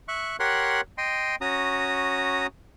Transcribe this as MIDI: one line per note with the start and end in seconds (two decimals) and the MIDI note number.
0.08 0.36 76
0.08 0.36 85
0.08 0.36 90
0.40 0.81 67
0.40 0.81 70
0.40 0.81 73
0.40 0.81 78
0.40 0.81 84
0.40 0.81 90
0.98 1.36 75
0.98 1.36 79
0.98 1.36 84
1.41 2.47 61
1.41 2.47 66
1.41 2.47 82
1.41 2.47 87